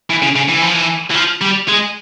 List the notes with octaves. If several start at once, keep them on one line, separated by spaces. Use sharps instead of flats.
E3
C#3
C#3
E3
F3
E3
E3
F3
G3
G#3